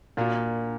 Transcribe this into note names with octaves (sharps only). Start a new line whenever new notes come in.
A#2 A#3 D4 F#4